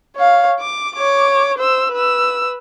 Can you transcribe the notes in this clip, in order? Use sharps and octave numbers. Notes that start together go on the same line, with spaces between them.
C#5 F5
D6
C#5 D6
C5 E6
B4 E6